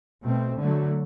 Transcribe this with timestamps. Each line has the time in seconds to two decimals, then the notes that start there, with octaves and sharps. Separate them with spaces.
0.23 B2 A3 C4
0.58 D3 F#3 A3